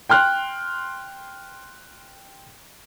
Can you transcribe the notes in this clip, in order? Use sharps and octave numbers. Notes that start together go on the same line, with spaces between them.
G5 C6 F6 F#6